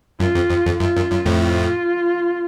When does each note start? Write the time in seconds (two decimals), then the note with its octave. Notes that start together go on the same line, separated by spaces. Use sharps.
0.20 F#2 F4
0.35 F2
0.50 F2
0.65 F2
0.80 F#2 F4
0.96 F#2
1.11 F#2
1.25 F2 A2
1.41 F4